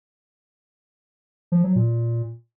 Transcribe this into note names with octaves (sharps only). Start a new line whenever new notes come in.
F3
F#3
A#2